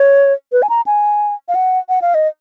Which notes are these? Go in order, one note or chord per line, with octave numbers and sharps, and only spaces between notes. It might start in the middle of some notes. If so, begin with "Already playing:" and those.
Already playing: C#5
B4
G#5
A#5
G#5
F5
F#5
F#5
F5
D#5